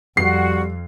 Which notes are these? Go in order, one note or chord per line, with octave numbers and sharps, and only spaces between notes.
F2 G3 F#4 F#5 C7